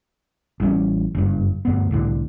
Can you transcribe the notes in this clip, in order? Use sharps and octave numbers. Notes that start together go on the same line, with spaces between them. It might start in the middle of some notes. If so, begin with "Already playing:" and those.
A1 G3 C#4
F#1 G2
D2 G2 B3
C2 A2 D3